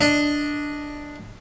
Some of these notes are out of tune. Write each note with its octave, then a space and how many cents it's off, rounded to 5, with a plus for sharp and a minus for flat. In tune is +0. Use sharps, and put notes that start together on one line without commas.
D4 +0 D#5 +0